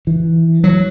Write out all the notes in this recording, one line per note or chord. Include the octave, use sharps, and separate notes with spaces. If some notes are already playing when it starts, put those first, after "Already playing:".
E3
F#3